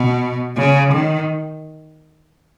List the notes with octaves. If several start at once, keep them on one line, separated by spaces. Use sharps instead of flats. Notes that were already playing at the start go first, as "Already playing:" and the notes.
Already playing: B2
C#3
D#3